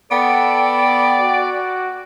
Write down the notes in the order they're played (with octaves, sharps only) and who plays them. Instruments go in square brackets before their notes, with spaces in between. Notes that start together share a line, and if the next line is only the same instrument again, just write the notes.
[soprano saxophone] B3 [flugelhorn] A4 [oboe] D5 [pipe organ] G5
[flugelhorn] F#4